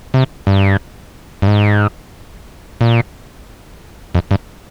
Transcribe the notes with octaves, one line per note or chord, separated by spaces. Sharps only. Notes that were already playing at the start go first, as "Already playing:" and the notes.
C3
G2
G2
G#2
A#2
F2
G2